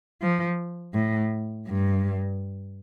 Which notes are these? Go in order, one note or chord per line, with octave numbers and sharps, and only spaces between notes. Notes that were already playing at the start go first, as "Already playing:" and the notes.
F3
A2
G2